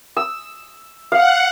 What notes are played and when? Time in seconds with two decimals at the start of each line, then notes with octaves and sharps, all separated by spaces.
0.17 E6
1.12 F5 F#5